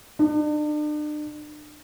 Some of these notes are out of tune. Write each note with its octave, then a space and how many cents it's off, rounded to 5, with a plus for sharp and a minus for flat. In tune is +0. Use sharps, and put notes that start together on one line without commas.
D4 +40